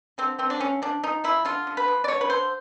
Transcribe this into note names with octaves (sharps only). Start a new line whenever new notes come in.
D3 C4
D3 C4
D4
D3 C#4
F3 D4
F3 D#4
F3 E4
D3 F4
D3
B4
F3
D5
D3 C#5
B4
D3 C5